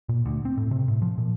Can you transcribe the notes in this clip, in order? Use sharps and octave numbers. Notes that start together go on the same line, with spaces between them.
A#2
D2
C4
A2
C3
A2
F3
A#2